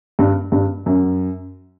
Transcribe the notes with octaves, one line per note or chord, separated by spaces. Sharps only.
G2
G2
F#2